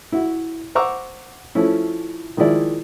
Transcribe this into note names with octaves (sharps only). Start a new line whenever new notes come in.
E4 F#4
C5 F#5 A#5 C#6 D6 E6
F3 A3 C#4 E4
D#3 F3 G#3 E4 D5